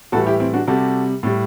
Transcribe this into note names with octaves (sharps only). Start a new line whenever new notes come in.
A2 E3 G3 F#4 A4
E4 G4
C4 E4
D4 F#4
C3 G3 F#4 A4
A2 G3